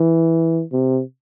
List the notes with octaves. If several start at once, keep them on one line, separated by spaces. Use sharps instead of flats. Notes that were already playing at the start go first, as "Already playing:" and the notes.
Already playing: E3
C3